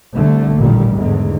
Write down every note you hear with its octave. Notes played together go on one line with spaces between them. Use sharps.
C2 D3 A3
A1 D#2 A#2 D#3 G3
E2 G#2 D3